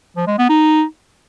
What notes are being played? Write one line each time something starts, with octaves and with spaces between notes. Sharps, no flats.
F3
G#3
B3
D#4